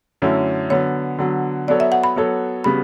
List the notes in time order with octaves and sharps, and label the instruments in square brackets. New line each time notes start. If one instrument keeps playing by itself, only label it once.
[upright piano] F#2 D3 A3 C#4 E4
[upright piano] D3 F#3 B3 [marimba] C#5
[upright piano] D3 F#3 B3
[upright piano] F#3 B3 F#4 A4 C#5 [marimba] D5
[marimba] E5
F#5
B5
[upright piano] F#3 B3 F#4 A4 C#5
[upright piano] C#3 G3 B3 F#4 [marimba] B5